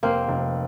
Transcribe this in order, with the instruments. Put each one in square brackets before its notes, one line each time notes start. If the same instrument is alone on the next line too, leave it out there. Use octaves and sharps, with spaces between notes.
[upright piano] F1 [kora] A#3 C4
[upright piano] F1